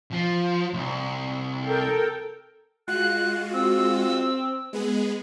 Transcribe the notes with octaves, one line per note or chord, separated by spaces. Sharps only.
F3
C2
A4 A#4 G5
G#3 F4 F#4 F#6
C4 E6
G#3 B3 G#4